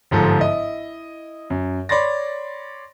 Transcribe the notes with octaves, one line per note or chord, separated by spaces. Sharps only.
G1 G#2 F3 A4
E4 D#5
F#2
C#5 D5 B5 C6 A6 A#6